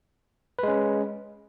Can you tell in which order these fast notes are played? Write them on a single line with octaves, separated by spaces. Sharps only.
B4 G#3 C#4